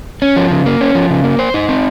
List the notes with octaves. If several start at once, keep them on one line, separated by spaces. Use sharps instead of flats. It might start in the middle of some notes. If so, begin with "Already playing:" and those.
C#4
F3
C#3
A#3
C#4
F3
C#3
A#3
C5
D#4
C4